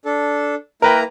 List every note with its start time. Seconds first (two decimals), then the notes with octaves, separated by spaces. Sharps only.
0.05 D4 A4
0.82 A#3 E4 A#4 B4 G5 A#5